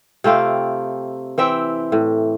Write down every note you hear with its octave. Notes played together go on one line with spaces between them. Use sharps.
C3 A3 F4 G4
E3 C4 E5 G5
A2